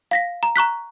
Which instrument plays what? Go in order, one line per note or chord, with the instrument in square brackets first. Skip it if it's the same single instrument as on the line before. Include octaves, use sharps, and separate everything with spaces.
[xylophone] F5 A#6 B6
A#5
A#5 C#6 F#6 B6